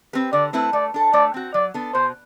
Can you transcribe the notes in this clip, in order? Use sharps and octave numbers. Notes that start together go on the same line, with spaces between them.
C4 G4 B4
D3 D5
A3 C4 E4 B4
A3 D5
D4 A4
A3 D5
C4 F#4
F#3 D5
B3 D4 A4
B2 C5